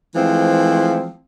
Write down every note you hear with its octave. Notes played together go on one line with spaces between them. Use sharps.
E3 F3 G#3 A3 C4